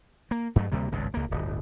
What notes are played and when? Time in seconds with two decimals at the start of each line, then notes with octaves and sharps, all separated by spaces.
0.31 A#3
0.56 G2 F#3 A3
0.72 D2 C3 G3 A#3
0.92 G#1 C#2 G2
1.14 C#2 A#3
1.31 D1 G1